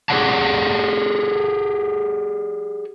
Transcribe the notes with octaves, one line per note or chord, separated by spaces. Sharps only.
G4 G#4 C#5 D5 F#5 A5